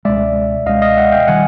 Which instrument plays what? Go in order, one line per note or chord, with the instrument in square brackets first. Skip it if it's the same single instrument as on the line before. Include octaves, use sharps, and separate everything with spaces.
[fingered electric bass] C#2 B2 G#3 [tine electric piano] D5 E5
[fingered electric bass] C#2 B2 G#3 [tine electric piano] D#5 F5
[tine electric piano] D#5 F5
E5 F#5
F5 G5
[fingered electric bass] D#3 G3 [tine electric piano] F#5 G#5